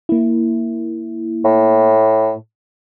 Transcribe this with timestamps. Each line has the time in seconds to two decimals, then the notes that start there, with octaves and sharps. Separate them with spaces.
0.09 A#3 E4
1.44 A2